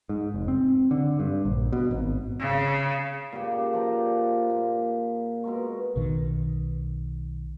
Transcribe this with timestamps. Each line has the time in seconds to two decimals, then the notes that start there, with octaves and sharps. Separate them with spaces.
0.09 G#2
0.34 F1
0.48 C4
0.91 D3
1.20 G2
1.45 A#1
1.73 B2
1.91 G#1
2.39 C#3
3.32 A#2 C#3 A#3 G4
3.73 F3 D5 G5 A#5
4.50 A#2
5.44 B2 G#3 A#4 C#6
5.96 B1 B2 D#3